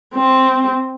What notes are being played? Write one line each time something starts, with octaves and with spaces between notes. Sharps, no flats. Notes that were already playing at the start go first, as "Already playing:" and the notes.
C4